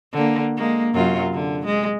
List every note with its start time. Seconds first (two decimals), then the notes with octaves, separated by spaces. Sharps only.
0.13 D3 A#3
0.57 G#3 A#3
0.94 F#2 C3 F4
1.33 D3
1.66 G#3